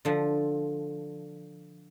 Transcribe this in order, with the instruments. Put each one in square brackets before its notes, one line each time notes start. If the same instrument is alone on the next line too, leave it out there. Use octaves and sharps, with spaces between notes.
[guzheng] D3 F3